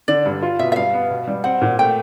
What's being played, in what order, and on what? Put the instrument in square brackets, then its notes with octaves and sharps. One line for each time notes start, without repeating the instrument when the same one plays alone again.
[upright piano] D3 [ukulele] D5
[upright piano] G2
F4
[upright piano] B2 [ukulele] E5
[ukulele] E5
[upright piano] G2 [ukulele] F5
[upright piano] B3
B2
G3
[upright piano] C4 [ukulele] F#5
[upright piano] A#2
[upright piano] A3 [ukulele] G5